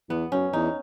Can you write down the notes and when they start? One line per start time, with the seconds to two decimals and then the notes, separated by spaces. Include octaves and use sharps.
0.09 E2 B3
0.32 F#2 C#4
0.53 E2 D#4